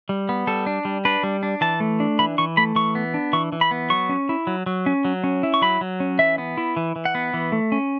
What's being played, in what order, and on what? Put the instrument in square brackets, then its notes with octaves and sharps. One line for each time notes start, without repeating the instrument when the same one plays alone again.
[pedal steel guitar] G3
B3
G3 A4
D4
G3
D4 B4
G3
D4
E3 A5
A3
D4
E3 B5
E3 C#6
A3 B5
E3 C#6
B3
D4
E3 C#6
E3
B5
B3
F#3 C#6
C#4
E4
F#3
F#3
C#4
F#3
C#4
E4
C#6
F#3 B5
F#3
C#4
E3 E5
B3
E4
E3
E3
F#5
B3
E3
A3
C#4